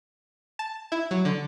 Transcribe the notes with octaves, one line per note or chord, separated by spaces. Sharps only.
A5
E4
F#3
D3